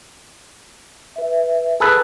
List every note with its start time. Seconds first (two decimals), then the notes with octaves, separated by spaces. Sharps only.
1.16 B4 E5
1.80 G#4 A4 B4